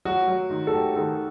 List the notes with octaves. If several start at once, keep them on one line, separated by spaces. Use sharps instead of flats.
F#3 F#4
F#3
D#3
A4
F#3 G4
D#3 A4